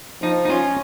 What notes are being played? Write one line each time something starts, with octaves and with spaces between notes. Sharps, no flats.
F3 D#4
D#4
C#4 F4